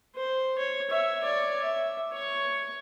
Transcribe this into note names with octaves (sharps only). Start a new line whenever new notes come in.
C5
C#5
C#5 E5
C#5 D5
E5
C#5 C#6